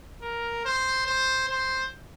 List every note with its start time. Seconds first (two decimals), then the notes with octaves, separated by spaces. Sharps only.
0.22 A#4
0.65 C5
1.06 C5
1.49 C5